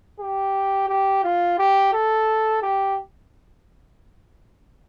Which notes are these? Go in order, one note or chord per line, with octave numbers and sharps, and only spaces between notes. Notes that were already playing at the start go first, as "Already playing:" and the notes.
G4
G4
F4
G4
A4
G4